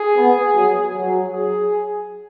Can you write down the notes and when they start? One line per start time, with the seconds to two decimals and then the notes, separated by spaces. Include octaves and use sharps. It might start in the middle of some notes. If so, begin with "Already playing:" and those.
Already playing: G#4
0.17 B3
0.55 F#3
0.94 F#3
1.33 G#4